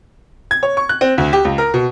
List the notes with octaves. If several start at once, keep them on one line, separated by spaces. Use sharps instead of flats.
G#6
C#5
C#6
F#6
C4
D2
G4
C#2
A#4
B2